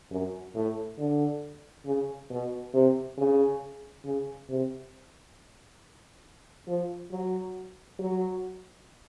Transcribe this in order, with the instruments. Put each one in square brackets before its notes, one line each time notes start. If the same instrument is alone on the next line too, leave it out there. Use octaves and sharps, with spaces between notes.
[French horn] F#2
A2
D3
C#3
B2
C3
C#3
C#3
C3
F3
F#3
F#3